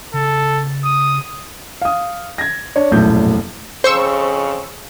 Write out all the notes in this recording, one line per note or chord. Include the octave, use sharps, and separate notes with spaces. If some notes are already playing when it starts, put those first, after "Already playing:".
C#3 A4
D#6
F5 D#6
G#6 A#6
D4 C#5 D5
E1 A#1 F#2 A2 A3 G6
F2 C#3 C5 C#6 E6